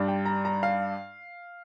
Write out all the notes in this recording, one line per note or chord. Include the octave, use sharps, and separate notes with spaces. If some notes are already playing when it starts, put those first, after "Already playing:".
Already playing: G2 G3 D4
G5
A#5
A#5
F5